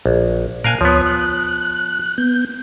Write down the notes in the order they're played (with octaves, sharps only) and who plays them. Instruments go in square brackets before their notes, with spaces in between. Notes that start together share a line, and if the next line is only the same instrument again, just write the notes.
[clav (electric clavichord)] A#1
[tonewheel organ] A#2 A5 F#6 [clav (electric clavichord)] A#4 F5 G#5
[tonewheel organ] D2 C#5 D#6 [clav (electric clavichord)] F3 B3
[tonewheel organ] F#6
B3 G6